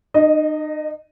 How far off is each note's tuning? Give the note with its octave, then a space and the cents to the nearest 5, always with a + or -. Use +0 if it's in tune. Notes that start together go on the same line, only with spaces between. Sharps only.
D#4 -40 D#5 +0